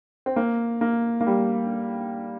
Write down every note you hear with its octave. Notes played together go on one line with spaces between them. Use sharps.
C4
A#3
A#3
A#3
G3